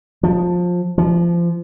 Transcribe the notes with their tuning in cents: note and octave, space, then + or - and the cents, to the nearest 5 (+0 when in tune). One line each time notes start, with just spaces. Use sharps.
F3 +20
F3 -25